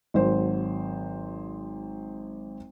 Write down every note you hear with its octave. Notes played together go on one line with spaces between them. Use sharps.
G#1 F#3 C5